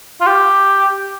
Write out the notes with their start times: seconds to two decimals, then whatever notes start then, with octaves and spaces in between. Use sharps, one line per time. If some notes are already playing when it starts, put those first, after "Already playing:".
0.21 F4
0.27 G4